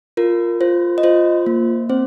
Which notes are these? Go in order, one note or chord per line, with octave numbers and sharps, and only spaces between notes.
F4 A#4
F4 C5
D#5
F4 C5
A#3
C4 C5